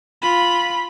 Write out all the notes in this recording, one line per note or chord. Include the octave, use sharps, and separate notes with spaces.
F4 B5